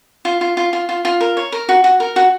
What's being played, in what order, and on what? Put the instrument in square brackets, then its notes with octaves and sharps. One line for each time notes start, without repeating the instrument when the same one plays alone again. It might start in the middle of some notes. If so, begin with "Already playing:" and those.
[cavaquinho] F4
F4
F4
F4
F4
F4
A#4
C#5
A#4
F#4
F#4
A#4
F#4